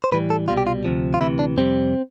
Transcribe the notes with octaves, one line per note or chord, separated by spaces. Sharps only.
C5
A2 E3 G3 B4
A4
C2 B2 G3 F4
G4
F4
D2 C3 F3
F4
D2 C3 E3 E4
D4
F2 C3 G3 C4